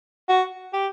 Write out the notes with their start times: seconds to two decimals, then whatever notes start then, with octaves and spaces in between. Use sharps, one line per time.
0.29 F#4
0.74 G4